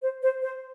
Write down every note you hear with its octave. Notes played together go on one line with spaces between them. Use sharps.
C5
C5
C5